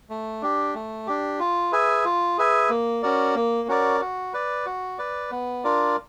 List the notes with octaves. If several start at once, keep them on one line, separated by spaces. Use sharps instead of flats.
A3
D4 G4
A3
D4 G4
F4
G#4 B4 E5 G#5
F4
G#4 B4 E5 G#5
A#3
C#4 F#4 A#4 D5
A#3
C#4 F#4 A#4 D5
F#4
B4 D5
F#4
B4 D5
B3
D4 F4 A#4 D5